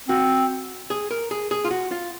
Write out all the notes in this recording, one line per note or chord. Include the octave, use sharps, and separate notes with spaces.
C4 F#4
G#4
A#4
G#4
G#4
F4
F#4
F4